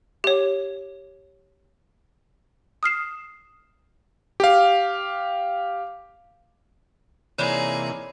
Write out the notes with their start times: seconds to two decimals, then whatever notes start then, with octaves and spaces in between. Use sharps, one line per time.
0.24 G4 C#5
2.83 D#6 F6 C7 E7
4.40 G4 F5
7.38 C3 E3 A#3 D#4 G#4 C#5 D5 B5